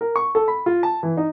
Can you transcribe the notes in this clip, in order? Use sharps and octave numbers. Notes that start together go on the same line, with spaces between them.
A#4
C#6
A4
B5
F4
A5
E3
D#4